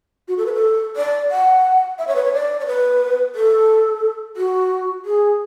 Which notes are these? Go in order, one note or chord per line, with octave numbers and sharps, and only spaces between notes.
F#4
A4
B4
A4
D5
F#5
E5
C#5
B4
C#5
D5
C#5
B4
A4
F#4
G#4